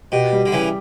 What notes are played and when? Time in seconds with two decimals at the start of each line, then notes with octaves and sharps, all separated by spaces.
0.12 B2 G4
0.33 G3
0.46 D3
0.52 C#3 E3 G4